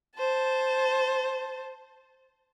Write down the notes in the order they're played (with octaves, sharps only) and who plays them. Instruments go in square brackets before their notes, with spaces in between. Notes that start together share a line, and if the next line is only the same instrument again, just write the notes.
[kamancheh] C5 A5